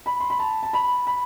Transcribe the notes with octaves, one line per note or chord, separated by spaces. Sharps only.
B5
C6
B5
A5
A5
B5
B5